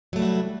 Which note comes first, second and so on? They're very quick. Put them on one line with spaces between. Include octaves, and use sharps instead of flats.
F#3 A3 G3 F#4 E4